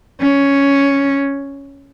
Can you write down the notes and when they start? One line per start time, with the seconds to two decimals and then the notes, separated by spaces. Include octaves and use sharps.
0.21 C#4